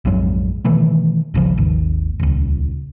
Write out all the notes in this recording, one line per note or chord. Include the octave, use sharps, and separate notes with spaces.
A#1 F2 G#2 F#3
B2 D#3 E3 A3
D1 G#1 C#3 F3
G#1 D#2
D#1 C#2